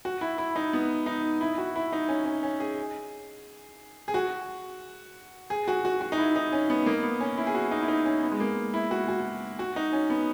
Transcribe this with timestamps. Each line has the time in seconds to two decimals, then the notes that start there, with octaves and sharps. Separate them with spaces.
0.05 F#4
0.21 E4
0.38 E4
0.56 D#4
0.73 B3
1.06 D#4
1.41 E4
1.58 F#4
1.76 E4
1.93 D#4
2.09 C#4
2.26 C#4
2.43 C#4
2.60 G#4
4.08 G#4
4.14 F#4
5.50 G#4
5.68 F#4
5.85 F#4
6.01 F#4
6.12 D#4
6.18 E4
6.36 D#4
6.52 C#4
6.70 B3
6.86 A#3
7.03 B3
7.20 C#4
7.37 E4
7.47 G#4
7.55 F#4
7.71 D#4
7.82 E4
7.88 D#4
8.05 C#4
8.23 B3
8.32 G#3
8.40 A#3
8.74 E4
8.91 F#4
9.08 F#4
9.59 F#4
9.76 D#4
9.93 C#4
10.10 B3